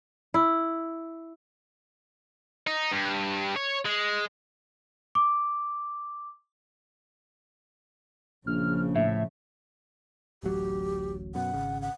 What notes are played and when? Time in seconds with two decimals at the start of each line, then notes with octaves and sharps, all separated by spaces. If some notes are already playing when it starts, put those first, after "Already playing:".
0.34 E4
2.67 D#4
2.92 G2
3.56 C#5
3.85 G#3
5.15 D6
8.47 A#1 C#3 F3 F6
8.95 A2 E5
10.43 D1 A1 F#3 G4
11.35 F#2 B2 F#5
11.54 G#1 C#3
11.82 F#5